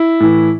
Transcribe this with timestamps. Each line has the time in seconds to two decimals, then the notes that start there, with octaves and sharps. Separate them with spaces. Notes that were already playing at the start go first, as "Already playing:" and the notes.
Already playing: E4
0.20 A2 E3